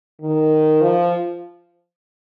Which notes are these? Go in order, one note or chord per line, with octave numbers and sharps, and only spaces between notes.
D#3
F3